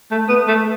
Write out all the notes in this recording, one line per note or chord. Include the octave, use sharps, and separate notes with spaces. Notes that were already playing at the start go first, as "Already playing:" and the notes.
A3
B3
A3